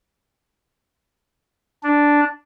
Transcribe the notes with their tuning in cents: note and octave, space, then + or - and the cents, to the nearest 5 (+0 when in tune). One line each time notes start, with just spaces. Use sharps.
D4 -5